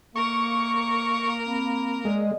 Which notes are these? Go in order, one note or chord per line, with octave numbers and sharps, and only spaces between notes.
A#3 A#4 C#6
C4 A#5 B5
G#3 D5 D#5